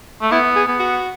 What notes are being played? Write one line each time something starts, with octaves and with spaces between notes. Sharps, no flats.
A3
B3 E4
G#4
B3
F#4